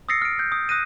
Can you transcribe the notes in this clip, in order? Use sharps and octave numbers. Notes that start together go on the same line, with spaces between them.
D#6 E6 A6 A#6 C7 C#7
F6 D7
G6
D#6
D#6 F#6 A#6 D#7